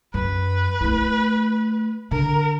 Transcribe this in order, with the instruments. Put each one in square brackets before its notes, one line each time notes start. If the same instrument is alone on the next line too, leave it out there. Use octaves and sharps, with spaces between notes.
[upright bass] F#2 [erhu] B4
[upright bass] A3 E4
[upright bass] D3 [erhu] A#4